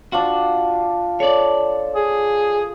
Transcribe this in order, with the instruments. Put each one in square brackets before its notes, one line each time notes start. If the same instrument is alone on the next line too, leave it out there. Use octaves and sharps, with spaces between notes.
[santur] D4 F4 [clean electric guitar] F#4
[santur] A4 [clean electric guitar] C#5 D5
[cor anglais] G#4